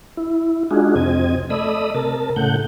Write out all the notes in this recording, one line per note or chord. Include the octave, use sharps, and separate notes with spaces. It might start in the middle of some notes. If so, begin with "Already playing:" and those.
E4
G#3 D4 D#4 F4 F#4 G#4
F2 C3 C4 D#5 G#6
A3 D5 D#5 B5 D#6 E6
C3 A#4 A5
A2 C#3 A3 F#5 G6